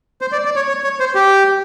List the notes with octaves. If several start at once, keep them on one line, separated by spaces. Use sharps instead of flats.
C5
D5
D5
C#5
C#5
C#5
C5
G4